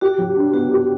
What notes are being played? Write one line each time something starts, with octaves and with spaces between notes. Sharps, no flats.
F#4 G4
F#3
D4
B3 F#4
G4